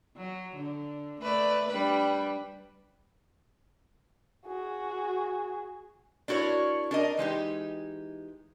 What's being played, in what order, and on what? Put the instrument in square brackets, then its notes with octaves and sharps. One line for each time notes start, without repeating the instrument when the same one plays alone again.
[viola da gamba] F#3
D3
A3 B4 D5
G3 D4 B4
[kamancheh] F#4 G#4
[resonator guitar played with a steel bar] D4 E4 F#4 A#4 C#5
D4 A#4 D#5
E3 G#3 D#4 G4